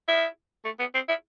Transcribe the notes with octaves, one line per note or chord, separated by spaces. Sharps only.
E4
A3
B3
C4
E4